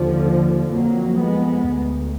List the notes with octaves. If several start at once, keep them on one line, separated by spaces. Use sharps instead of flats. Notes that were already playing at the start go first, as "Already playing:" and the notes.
Already playing: D#2 D3 F3
F2 F#3 A#3
G#3 B3
D2